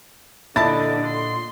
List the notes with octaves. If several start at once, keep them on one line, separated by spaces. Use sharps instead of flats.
A#2 D3 D4 E4 D#5 A5 A6
C6